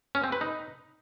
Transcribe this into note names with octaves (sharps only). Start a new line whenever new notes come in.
C#4
C4
B4
D#4